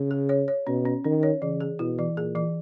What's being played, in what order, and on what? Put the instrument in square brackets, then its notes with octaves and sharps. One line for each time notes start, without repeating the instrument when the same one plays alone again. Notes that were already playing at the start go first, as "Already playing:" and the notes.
Already playing: [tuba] C#3
[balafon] G#4
C#5
C#5
[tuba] B2 [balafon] C#4
[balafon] C#4
[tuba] D#3 [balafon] C#4
[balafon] C#5
[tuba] C#3 [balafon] E3
[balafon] G#4
[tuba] B2 [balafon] E4
[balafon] E3
[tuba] A#2 [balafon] G#4
[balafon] E3